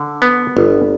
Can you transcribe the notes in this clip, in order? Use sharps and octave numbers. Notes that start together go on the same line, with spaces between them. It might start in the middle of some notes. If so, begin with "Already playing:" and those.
Already playing: D3
B3
G1